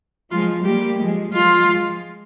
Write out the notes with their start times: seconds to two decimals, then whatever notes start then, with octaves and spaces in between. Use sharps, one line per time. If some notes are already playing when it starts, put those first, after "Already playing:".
0.31 F3 G#3 F4
0.65 G3 A#3 G4
0.99 F3 G#3
1.33 F3 G#3 F4
1.68 F3 G#3